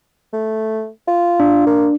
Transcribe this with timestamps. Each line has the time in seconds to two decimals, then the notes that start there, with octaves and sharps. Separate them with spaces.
0.33 A3
1.07 F4
1.40 D4
1.67 A#3